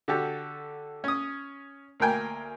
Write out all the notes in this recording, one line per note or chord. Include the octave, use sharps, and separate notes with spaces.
D3 F#4 G4 A4
C#4 D#6
D2 A#3 A#4 G5 G#5